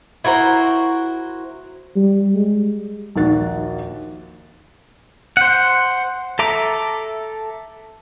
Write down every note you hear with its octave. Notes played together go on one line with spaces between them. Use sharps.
E4 F#4 A#4 C5
G3
G#3
A#1 D#2 D#3 A#3 F#4 A6
C5 F#5
A4 E5 A#5 D6